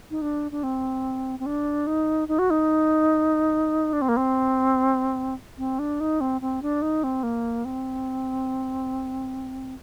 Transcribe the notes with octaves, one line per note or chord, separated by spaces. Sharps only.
D#4
D4
D4
C4
C4
D4
D#4
D#4
F#4
D#4
D4
C4
A#3
C4
C4
D4
D#4
C4
C4
D4
D#4
C4
A#3
C4